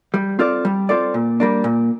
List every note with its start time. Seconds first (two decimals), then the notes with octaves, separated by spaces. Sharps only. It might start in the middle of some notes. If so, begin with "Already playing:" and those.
0.14 G3
0.39 C4 F4 A4 D5
0.65 G3
0.89 C4 F4 A4 D5
1.14 A#2
1.40 G3 A#3 D4
1.64 A#2